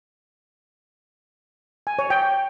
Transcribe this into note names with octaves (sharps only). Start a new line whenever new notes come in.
G#5
C#5
G5